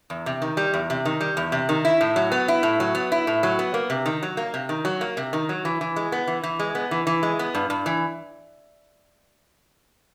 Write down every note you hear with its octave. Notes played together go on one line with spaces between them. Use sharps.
E2
C3
D#3
G3
E2
C3
D#3
G3
E2
C3
D#3
E4
A2
F#3
B3
E4
A2
F#3
B3
E4
A2
F#3
B3
A#3
C3
D#3
F#3
A#3
C3
D#3
F#3
A#3
C3
D#3
F#3
E3
E3
G#3
B3
E3
E3
G#3
B3
E3
E3
G#3
B3
G2
G2
E3